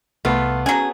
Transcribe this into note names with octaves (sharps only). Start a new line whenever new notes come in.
C2 A3 B3 F4
F#3 C#4 G#4